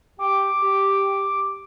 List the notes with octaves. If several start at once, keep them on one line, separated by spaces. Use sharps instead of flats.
G4 G5 D6
G4